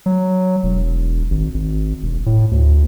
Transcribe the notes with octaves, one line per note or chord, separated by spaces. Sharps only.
F#3
E1
G#1
G#1
E1
A2
D2